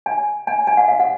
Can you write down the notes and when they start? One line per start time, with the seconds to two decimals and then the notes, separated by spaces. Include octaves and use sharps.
0.06 G#5
0.47 G#5
0.67 G#5
0.77 F#5
0.88 F5
1.00 F#5